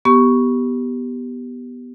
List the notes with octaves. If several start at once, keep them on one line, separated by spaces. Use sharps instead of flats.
B3 G4 C#6